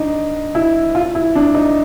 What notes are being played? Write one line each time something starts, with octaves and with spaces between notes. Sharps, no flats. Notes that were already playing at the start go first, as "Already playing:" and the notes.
Already playing: D4 D#4
E4
F4
E4
D4
D#4